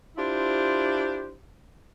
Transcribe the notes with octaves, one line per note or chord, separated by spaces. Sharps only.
D4 E4 F4 G4 C5